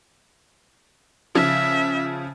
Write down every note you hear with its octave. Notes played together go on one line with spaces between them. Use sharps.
C#3 F3 E5